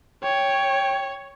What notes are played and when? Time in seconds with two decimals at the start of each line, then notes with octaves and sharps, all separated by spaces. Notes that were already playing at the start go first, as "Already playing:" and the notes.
0.23 C#5 G5